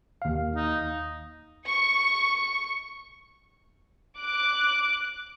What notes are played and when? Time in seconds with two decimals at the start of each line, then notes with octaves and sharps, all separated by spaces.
0.22 D#2 F5
0.56 D#4
1.67 C#6
4.19 D6 F#6